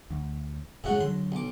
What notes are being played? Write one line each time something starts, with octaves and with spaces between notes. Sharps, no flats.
D2
F1 A2 C#3 G#3 F#4
D3 E3 F#3 C6
B1 D6